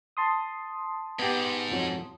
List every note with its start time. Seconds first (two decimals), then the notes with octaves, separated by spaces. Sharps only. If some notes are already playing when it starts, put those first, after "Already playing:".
0.17 A5 C6 D#6
1.19 G#2 B3 G4
1.72 F2 F#3